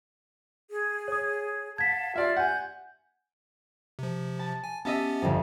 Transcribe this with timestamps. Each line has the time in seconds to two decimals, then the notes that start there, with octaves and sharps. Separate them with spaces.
0.71 G#4
1.08 C#5 D#6
1.78 F5 F#5 A5 G#6 B6
2.16 F4 D5 E5 F6
2.36 F#5 G#5 G6
3.99 C3 F3
4.39 A5
4.64 G#5
4.85 B3 C#4 G4 D#5 E5 A5
5.22 G1 F2